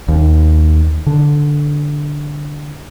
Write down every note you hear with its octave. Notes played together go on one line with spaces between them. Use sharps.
D#2
D3